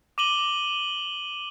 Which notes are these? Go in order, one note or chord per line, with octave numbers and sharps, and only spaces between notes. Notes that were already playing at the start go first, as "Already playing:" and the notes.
D6 D#7 F#7 G7